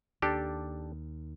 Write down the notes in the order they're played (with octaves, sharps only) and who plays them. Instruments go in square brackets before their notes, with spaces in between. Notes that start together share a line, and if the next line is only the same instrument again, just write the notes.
[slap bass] D#2 [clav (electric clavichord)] D4 G4 A4